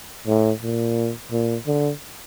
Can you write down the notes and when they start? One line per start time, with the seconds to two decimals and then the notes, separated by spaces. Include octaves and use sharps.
0.27 A2
0.62 A#2
1.31 A#2
1.67 D3